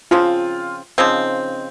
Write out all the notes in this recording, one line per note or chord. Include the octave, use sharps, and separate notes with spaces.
C#3 F3 C4 F4
C#3 F3 C4 D#4